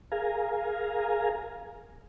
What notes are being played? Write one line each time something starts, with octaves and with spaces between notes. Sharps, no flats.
G#4 A#4 F5 G#5 A#5